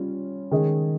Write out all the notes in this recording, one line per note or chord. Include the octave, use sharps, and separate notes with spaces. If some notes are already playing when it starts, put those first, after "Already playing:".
Already playing: G3 C#4 F4
D#3 G#3 C#4 G#4 D#5